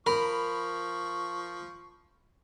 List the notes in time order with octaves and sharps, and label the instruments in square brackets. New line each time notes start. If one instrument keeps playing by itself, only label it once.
[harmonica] F3 C#6 [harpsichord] A#4 [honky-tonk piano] B5